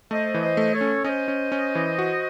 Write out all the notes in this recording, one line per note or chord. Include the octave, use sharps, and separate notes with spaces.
A3 C5 D#5
E3
C5 D#5
A3
A4 C#5
C#4
C#4 C5 D#5
C#4
C#4
E3
F#4